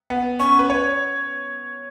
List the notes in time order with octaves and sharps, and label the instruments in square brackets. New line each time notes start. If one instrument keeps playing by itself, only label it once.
[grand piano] B3
[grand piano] C#4 [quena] C#6
[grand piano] B4
C#5